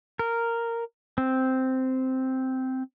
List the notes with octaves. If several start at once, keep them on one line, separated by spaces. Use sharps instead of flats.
A#4
C4